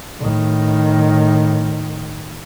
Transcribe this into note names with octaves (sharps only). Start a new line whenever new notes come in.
A2 D#3